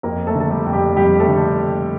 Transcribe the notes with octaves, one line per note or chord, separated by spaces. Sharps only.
F2 A#3 A#4
A3 A4
D3
A4
G3 G4
F2
G3 G4
F2 G3 G4
A3 A4
D3